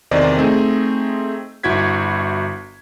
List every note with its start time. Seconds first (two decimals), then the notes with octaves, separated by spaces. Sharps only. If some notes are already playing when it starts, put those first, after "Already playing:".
0.11 E2 C3 D#3 C5 D5 D#5
0.38 A3 C4 D#4 G#4
1.63 G1 E4 F#4 G#6 B6